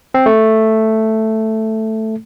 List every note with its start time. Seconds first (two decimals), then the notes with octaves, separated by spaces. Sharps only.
0.14 C4
0.26 A3